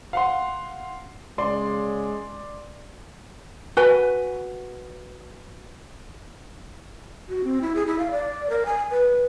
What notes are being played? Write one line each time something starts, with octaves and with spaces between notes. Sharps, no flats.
F5 F#5 C6
C#3 G#3 D5 C6
F#4 B4 G#5
F#4
C4
E4
G#4
E4
F5
D5
A#4
G#5
B4